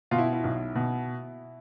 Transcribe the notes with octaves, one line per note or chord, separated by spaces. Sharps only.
B2 F4
E4
E4
B1
B2